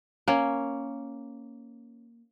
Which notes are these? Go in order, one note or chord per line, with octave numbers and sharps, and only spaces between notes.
A#3 C#4